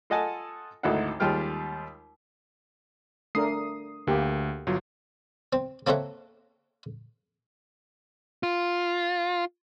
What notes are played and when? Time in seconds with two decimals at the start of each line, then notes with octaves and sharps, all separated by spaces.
0.10 F4 A4 D#5 F#5 G#5 A5
0.83 G#1 D2 D#4 E4 A4 F#5
1.20 D#2 G3 G#3 F4 G5 F6
3.35 A3 D4 A#4 D#6 C7
4.07 D2 A#3 G4
4.67 G1 F#3 F4
5.53 C4
5.87 A#3 C4 A4 C#5 E5 F#5
8.43 F4